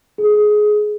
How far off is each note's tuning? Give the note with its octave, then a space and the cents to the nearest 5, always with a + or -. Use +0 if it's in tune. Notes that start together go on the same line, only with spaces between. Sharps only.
G#4 +15